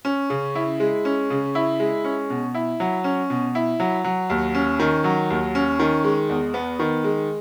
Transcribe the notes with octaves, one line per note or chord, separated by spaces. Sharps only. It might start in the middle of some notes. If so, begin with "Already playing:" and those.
C#4
C#3
E4
G#3
C#4
C#3
E4
G#3
C#4
B2
E4
F#3
C#4
B2
E4
F#3
F#3
D#2
C#4
D#3
F#3
D#2
C#4
D#3
G#3
E2
B3
D#3
G#3